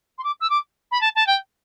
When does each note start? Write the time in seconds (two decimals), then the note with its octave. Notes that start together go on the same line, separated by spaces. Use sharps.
0.18 C6
0.24 D6
0.40 E6
0.50 D6
0.91 B5
1.01 A5
1.15 A5
1.27 G5